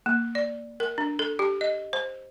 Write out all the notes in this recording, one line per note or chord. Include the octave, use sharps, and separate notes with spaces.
A#3
D5
A#4
D4
A4
G4
D#5
C5